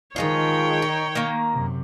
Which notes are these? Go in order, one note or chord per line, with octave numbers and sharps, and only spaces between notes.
D#3 F3 G#3 F4 C#5 G5
D#4
D#3 A#3
F#2 C3